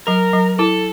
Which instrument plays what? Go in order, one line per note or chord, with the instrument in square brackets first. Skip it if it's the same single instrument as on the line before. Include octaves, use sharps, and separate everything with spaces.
[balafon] F#3 [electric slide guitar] A#4
[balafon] F#3
[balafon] E4 [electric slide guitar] A4